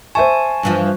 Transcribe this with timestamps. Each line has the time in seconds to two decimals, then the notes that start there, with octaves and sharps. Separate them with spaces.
0.15 C5 E5 G#5 A5 C#6
0.63 G2 E3 F3